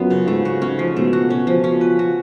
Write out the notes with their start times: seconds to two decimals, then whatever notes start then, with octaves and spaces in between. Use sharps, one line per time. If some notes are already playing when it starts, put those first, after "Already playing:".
Already playing: F#2 B3 F4
0.10 C#3
0.28 G#2 A3
0.45 F#4
0.62 C#4
0.79 F3
0.96 B2 A3
1.13 F#4
1.30 B2 C#4
1.47 F3
1.64 C#4
1.81 B4
1.99 F#4